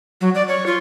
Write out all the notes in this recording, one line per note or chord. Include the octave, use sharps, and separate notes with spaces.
F#3
D5
C#5
F4